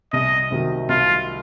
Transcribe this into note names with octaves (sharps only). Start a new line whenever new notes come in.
C2 D#5
C3 D#3 F#3
C2 F4